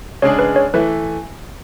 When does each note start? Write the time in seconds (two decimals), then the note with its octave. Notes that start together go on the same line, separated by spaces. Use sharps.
0.22 C#3 G#3 D4 G#4 C#5
0.39 B4
0.56 C#5
0.74 E3 A3 E4 B4